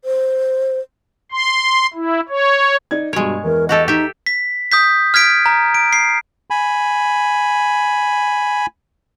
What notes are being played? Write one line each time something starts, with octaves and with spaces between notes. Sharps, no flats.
C5
C6
E4
C#5
D#4 D5 G#6
G2 B2 G#3 C#5 D7
E2 E3 A#4
F#4 G4 A4 D#5
D#4 G4 E5
B6
D#6 G6 B6
F6 G#6 B6 D7
A#5
D7
C7
G#5 B5